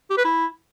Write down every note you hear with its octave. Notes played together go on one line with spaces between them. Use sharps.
G4
B4
E4